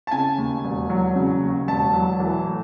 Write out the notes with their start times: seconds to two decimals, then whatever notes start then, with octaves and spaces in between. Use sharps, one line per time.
0.07 A5
0.11 C#3 G#5
0.38 D#2
0.64 E1
0.90 F#3
1.15 C#3
1.42 D#2
1.68 E1 A5
1.94 F#3
2.20 E3
2.46 A2